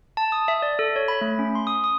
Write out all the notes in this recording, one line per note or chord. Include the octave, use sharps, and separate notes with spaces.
A5
D#6
E5
D5
A4
C#5
B5
A3
C#4
C6
D#6
D#6